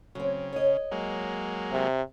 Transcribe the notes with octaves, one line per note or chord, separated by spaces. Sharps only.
C#3 F#3 C4
C#5 D#5
F#3 G#3 A#3
C3